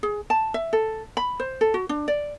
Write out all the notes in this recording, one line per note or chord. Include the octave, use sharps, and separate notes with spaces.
G#4
A5
E5
A4
B5
C5
A4
F#4
D4
D5